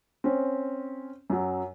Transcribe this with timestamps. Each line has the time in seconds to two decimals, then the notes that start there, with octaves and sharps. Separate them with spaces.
0.24 C4 C#4
1.30 F#2 F#3